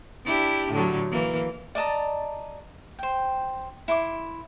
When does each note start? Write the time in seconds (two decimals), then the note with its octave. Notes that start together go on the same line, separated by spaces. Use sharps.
0.25 D4 E4 G4
0.70 A2 D3 F#3
1.11 E3 A#3
1.75 D5 D#5 A5 A#5
2.99 C5 G5
3.88 E4 C6 D6